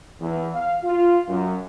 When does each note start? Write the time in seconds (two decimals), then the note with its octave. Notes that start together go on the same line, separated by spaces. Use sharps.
0.21 E2
0.53 F5
0.84 F4
1.29 F#2